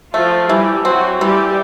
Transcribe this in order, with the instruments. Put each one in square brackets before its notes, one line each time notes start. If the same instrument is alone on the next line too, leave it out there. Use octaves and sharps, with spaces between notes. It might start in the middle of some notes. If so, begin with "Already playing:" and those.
[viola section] F3 F4 [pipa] A3
[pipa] E3 [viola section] G3 G4
[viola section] F#3 F#4 [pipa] C4
[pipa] E3 [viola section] G3 G4